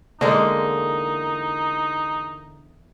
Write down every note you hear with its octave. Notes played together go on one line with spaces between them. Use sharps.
E2 D3 G#3 A#3 D#4 D5 D#5